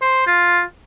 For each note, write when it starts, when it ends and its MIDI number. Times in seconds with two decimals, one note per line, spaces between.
0.02 0.25 72
0.27 0.62 65